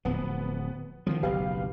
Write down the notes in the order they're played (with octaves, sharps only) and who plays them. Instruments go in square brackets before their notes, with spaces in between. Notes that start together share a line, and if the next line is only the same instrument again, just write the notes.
[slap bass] D1 F3 [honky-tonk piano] B3
[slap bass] D3 D#3 F#3 [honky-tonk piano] F3
[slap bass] F#1 B1 [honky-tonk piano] G4 B4 F5